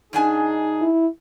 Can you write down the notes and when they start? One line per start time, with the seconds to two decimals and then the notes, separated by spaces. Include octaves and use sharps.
0.13 F#2 D4 D#4 G#4 G#5
0.81 E4